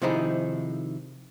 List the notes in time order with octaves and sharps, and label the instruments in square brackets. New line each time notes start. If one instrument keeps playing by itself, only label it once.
[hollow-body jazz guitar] C3 D#3 F3 D#4 E4 G#4